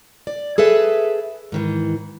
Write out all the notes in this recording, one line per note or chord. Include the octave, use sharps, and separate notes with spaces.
D5
G#4 A4 B4 E5
G#2 D#3 E3